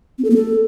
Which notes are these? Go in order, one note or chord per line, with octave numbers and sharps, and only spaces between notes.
C4
A4
A#3
A4